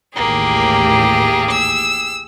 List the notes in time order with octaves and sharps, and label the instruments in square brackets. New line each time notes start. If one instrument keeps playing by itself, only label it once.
[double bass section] A1 D#2 A2 [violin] A#3 [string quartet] G4 G#4
[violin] E6